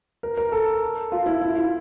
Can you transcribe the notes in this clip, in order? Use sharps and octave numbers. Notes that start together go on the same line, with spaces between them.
A#4
A#4
A4
F4
E4
E4
F4